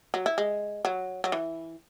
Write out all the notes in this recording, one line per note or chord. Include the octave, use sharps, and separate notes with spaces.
F#3
E4
G#3
F#3
F#3
E3